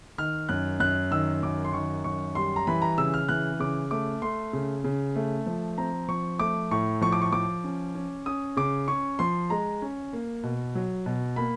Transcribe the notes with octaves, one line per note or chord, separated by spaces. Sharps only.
D#3 F6
F#2 F#6
F#2 F#6
D#3 E6
F#2 D6
C6
D#3 C#6
F#2 C#6
G3 C6
A#5
E3 B5
A#5
C#3 E6
F6
E3 F#6
C#3 D6
A3 D6
A3 C6
C#3
C#3
A3
F3
C4 A#5
F3 C#6
A3 D6
A2 C#6
F3 C#6
D6
C#6
F3 D6
C#4
C#4
C#4 D#6
C#3 D6
C#4 C#6
F3 C6
G#3 A#5
C#4
A#3
B2
F#3
B2
A#3 B5